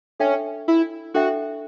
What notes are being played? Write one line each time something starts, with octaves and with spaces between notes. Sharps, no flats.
C#4 D4 A4 E5 G5
E4
D4 F#4 A4 E5 G5